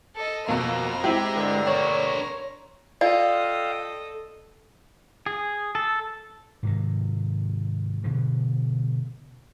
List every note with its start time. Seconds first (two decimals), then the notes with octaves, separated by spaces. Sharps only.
0.15 A4 D#5
0.49 F2 B2 A#3 A#5 C6
1.04 G#3 C4 E4 G4
1.35 G2 D3
1.67 D4 A#4 C#5
3.01 F4 A4 D5 D#5 F5 G5
5.26 G#4
5.75 A4
6.63 G#2 C3 D#3
8.04 B2 D3 F3